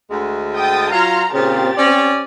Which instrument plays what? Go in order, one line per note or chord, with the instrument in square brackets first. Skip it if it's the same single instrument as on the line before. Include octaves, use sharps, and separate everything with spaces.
[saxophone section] D2 G#3
[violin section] G5 D#6 A6
[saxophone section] F#3 F4 [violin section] A#5 C6 F6
[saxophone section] A#2 C#3 [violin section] C4 G4 A6
[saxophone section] C#4 D5